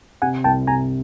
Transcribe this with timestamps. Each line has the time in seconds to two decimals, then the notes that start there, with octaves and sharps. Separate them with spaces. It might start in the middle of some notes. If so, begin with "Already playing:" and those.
0.22 C3 F#5 G#5
0.44 C2 G5 A5
0.67 C3 G#5 A#5